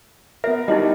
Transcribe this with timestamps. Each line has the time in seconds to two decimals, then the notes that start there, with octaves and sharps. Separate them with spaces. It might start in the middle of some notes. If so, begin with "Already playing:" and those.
0.44 B3 A#4 E5
0.68 G3 D#4 E4 F#4 D#5